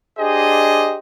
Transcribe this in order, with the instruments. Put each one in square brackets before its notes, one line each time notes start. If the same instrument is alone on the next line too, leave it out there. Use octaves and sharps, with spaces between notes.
[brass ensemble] D4 G4 G#4 C5 D#5